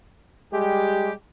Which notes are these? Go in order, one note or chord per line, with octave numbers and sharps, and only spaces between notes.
G3 G#3 G4